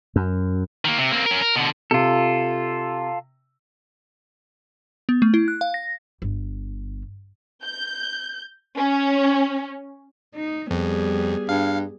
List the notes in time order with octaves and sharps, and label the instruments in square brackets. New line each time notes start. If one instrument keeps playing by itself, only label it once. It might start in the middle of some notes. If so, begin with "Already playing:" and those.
[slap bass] F#2
[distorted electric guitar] D#3 A#3
C3
A#3 C4
C#4 A#4
A#4
B2 D3
[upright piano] C3 [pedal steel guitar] F4 A4
[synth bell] B3
A3
E4
F#6
F5
A#6
[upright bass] G1
[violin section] G6
C#4
[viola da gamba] D#4
[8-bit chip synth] F2 [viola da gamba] G3 B3 G#4
[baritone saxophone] G2 [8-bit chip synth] F5